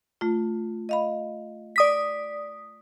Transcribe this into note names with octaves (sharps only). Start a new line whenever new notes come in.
A3 F4
D#5 F5 B5
D5 D#6 A#6 B6